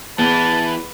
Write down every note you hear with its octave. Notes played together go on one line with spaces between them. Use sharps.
E2 E3 B4 A5